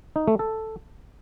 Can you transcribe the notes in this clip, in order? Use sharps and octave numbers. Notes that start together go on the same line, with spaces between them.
D#4
A3
A4